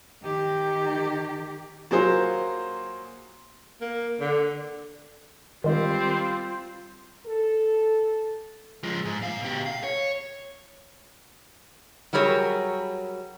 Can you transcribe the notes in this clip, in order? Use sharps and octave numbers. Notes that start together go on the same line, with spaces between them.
D#3 G4
F#3 A#3 F4 G#4 C5
A#3
D3
D#3 G3 G#3 C4 F4
A4
F3 G#3
G#2
G2 F5
B2 G4
F5
C#5
F#3 G3 G#4 A#4 C#5